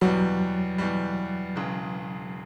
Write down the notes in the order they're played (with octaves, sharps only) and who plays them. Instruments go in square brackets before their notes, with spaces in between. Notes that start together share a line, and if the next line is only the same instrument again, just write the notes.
[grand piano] E2 B2 G3 [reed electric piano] F#3
[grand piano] E2 B2 G3
E1 E2 C#3